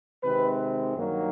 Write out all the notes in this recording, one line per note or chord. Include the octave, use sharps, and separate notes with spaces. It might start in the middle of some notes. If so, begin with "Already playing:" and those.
C3 D#3 G#3 C4 B4
G2 D#3 F#3 A#3